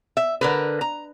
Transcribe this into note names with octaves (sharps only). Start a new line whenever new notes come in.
E5
D3 A#4 B4
A#5